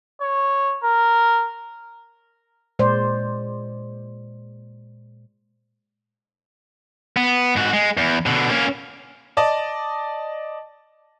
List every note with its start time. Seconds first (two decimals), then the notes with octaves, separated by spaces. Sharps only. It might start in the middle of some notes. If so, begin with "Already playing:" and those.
0.21 C#5
0.83 A#4
2.79 A#2 G#3 C5 D5
7.17 B3
7.56 G#2 F#4
7.73 G#3
7.97 E2
8.26 B2 D3
8.50 A#3 C#4
9.37 D5 D#5 A5